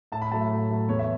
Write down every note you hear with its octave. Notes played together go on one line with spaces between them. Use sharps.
A2 A5
B5
F#3 A3 A5
E5
A2
F#3 A3
E2 C#5
E5